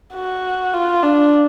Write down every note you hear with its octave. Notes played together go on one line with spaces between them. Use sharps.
F#4
F4
D4